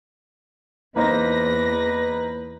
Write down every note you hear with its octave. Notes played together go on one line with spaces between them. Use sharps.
E2 A#3 D#4 B4 C5 A#6